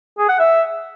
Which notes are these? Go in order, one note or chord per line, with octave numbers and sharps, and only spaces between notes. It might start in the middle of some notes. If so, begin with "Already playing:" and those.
G#4
F#5
E5